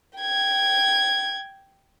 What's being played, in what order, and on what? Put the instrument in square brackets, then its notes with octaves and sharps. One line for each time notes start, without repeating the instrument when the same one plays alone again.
[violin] G5 G#6